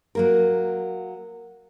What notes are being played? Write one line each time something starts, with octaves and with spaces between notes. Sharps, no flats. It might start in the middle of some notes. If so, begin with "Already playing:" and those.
F#3 A#3 A#4